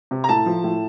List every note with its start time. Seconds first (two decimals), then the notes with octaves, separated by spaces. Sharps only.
0.11 C3
0.24 A#5
0.29 A2 A5
0.46 F3
0.64 A2